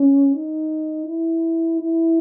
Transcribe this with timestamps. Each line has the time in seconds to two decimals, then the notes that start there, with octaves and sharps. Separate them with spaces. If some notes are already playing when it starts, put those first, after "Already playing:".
Already playing: C#4
0.35 D#4
1.06 E4
1.80 E4